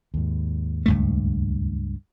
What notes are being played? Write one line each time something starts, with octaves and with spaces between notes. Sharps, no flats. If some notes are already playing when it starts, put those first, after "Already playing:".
D#2 G#2
C#2 G2 A3